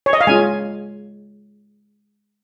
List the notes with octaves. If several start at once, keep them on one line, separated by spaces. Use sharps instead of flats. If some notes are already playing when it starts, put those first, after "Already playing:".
C#5
D#5
F5
G#3 C#4 F4 G#5